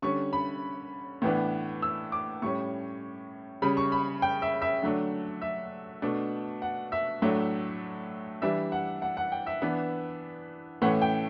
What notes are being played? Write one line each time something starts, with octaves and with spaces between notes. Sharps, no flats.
D3 G3 C#4 C#6
B5
A2 E3 B3 D4
E6
D6
A2 G3 C#4 C#6
C#3 G3 C#4 B5
C#6
B5
G5
E5
E5
D3 F#3 A3 D4
E5
B2 A3 D4
F#5
E5
A2 F#3 A3 D4
E3 G3 D4 E5
F#5
F#5
F#5
G5
E5
E3 B3 D4
A2 E3 A3 C#4 F#5
G5